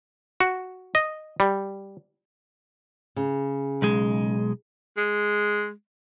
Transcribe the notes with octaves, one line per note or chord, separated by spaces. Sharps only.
F#4
D#5
G3
C#3
B1 G#3
G#3